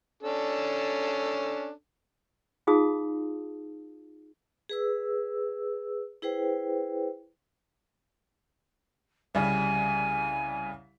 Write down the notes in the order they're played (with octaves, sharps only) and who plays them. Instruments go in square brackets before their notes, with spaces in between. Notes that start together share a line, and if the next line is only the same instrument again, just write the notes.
[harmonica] C#4 D4 A4
[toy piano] D#4 F4 G#4 F5 A5 D#6
[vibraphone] G#4 B4 E6
E4 G#4 B4 C5 G5
[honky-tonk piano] C2 C#3 G3 [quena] G#5